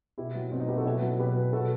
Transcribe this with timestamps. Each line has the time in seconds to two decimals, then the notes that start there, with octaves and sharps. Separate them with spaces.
0.18 B2 E4 G4
0.35 F#3
0.52 B2 C4
0.60 D#4
0.68 F#3 G4 B4
0.77 F#4 A4
0.85 B2 E4 G4
1.02 F#3
1.19 B2 G4 B4
1.36 F#3
1.53 B2 F#4 A4